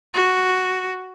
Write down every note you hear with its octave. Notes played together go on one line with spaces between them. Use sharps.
F#4